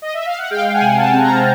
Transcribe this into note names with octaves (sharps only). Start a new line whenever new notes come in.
D#5
E5
F5
F#5
G#3 F5 G5
F#5 G#5
C3
G5 A5
C4
G#5 A#5